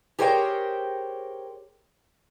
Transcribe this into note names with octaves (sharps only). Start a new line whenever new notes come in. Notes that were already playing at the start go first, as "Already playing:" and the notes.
G4 G#4 A#4 C5 C#5 G5